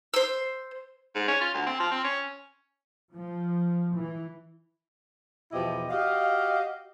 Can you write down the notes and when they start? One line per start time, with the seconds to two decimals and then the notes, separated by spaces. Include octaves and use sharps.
0.14 C5 E6
1.15 G#2
1.28 C#4
1.41 F4
1.54 D2
1.67 C4
1.80 F3
1.91 C4
2.04 C#4
3.12 F3
3.95 E3
5.52 E2 B2 F3 E4 G4 D#5
5.90 F#4 G4 D#5 F5